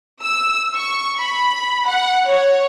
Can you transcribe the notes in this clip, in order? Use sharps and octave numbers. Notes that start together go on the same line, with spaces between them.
E6
C#6
B5
F#5
C#5